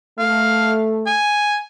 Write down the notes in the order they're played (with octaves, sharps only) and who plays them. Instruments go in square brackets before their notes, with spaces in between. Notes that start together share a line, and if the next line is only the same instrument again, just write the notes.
[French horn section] A3 [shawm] F5
[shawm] G#5